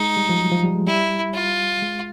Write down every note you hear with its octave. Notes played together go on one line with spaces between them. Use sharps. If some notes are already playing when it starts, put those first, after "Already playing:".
Already playing: G#3 D#4
G3
F3
F#3
F3
G3
G#3
G3 E4
F4
G#3